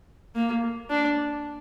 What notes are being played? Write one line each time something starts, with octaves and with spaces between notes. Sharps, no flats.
A#3
D4